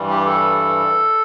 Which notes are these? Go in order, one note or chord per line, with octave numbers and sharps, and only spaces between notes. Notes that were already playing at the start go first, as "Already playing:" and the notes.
Already playing: G2 E3 G3
G4
A4